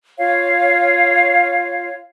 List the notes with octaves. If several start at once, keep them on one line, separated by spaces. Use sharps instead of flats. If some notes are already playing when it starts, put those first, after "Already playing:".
F4 C#5 F5